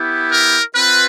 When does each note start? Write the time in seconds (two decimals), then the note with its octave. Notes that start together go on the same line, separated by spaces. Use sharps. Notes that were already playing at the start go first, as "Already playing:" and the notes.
Already playing: B3 E4 G4
0.30 A#4
0.73 C4 F4 B4